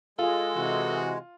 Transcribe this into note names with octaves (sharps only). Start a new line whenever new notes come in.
G#3 F4 A4
C3 E3 F#4